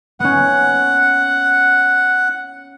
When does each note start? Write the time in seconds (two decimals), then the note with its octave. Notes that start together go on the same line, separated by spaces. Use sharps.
0.20 B3 C#4 F#5